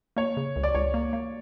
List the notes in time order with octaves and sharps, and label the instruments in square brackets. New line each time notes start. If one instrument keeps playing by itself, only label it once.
[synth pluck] A#3 [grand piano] C#5
[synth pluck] C#3
C#2
[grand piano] D5
[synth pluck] C#2 [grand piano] C#5
[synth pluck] A#3
A#3